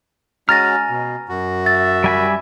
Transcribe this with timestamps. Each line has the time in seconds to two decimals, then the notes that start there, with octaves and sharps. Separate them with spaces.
0.49 G#3 C#4 F#4 G#5 A#5 F6 A6 A#6
0.90 B2
1.29 F#2 F#4
1.66 E5 A6
2.04 G3 G#5 B5